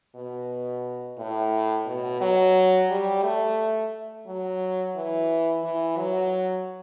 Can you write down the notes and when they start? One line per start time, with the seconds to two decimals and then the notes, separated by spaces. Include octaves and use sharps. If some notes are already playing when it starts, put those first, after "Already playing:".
0.15 B2
1.17 A2
1.86 B2
2.21 F#3
2.89 G3
3.23 A3
4.27 F#3
4.95 E3
5.64 E3
5.97 F#3